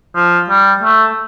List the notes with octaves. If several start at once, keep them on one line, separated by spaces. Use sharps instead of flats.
F3
G3
A3